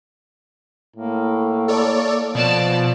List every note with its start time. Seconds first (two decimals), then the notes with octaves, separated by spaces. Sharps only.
0.96 A2 A#3
1.68 A4 C#5 D5
2.35 B2 F3 D5 A5